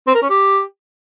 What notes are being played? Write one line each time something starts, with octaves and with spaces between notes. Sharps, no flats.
C4
A#4
C#4
G4